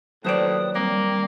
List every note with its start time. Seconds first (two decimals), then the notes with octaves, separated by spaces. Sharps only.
0.25 D#2 A2 F#3 B4 C5 D5 D#6
0.75 G3 A#3 C4